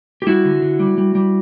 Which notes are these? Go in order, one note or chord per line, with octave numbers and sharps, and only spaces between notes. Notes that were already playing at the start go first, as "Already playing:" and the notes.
G4
G3 E4 F#4
D3
D3
G3
G3
G3